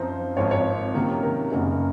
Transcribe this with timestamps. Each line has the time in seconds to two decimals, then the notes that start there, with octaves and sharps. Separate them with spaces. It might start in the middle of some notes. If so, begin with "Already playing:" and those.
Already playing: F#2 F3 C4 D#4 C5
0.37 G#1 G#2 F3 C4 C#5
0.51 C#5
0.94 C3 D#3 F#3 A#3 C#4
1.23 A#4
1.51 F#1 F#2 C#3 F#3 A#3